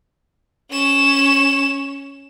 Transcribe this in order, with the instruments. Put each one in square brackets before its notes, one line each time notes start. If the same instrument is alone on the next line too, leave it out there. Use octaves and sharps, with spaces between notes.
[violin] C#4 E7